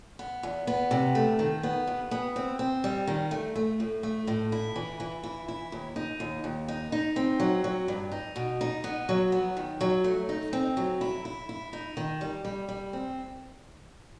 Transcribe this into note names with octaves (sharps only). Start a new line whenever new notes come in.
B3
E2
B3
C3
A3
D#3
B3
G2
B3
C4
C4
G3
D#3
A3
A3
A2
A3
A2
E4
E3
E3
E4
E4
D#2
D#4
D#2
D#2
D#4
D#4
C4
F#3
F#3
G2
D#4
B2
D#4
B3
F#3
B3
D#3
F#3
A3
D#4
C4
F#3
E4
E4
E4
D#4
D#3
G3
G3
G3
C4